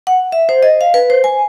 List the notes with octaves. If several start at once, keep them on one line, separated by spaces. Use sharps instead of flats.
F#5
E5
C5
D#5
F5
B4
C5
G#5